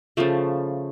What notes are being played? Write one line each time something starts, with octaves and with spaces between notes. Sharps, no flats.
C#3 F3 A3